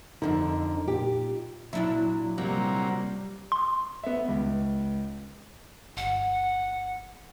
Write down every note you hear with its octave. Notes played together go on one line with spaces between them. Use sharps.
F2 G#2 D3 D#4
A#2 G4
A#2 F#3 D4 E4
C3 F#3 G3 A#3
C6
B3 E5
C#2
G1 F#5